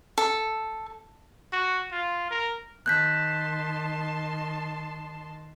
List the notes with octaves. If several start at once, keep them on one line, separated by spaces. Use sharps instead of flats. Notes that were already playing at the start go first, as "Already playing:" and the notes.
A4
F#4
F4
A#4
D#3 A5 C6 F#6 G6 B6